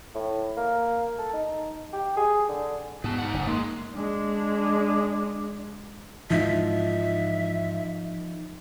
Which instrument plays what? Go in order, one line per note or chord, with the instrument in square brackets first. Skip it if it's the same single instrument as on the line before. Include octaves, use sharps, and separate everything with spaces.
[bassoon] A2
A#3
A4
D#4
G4
G#4
D3
[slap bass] G#2 [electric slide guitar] B3 A5
[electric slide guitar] D#4 F#5
[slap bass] F#1 C#3
[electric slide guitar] G#3 [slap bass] A#3
[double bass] G#3 D4
[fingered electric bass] G#2 E3 [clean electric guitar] F3 D#4 F4 [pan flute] E5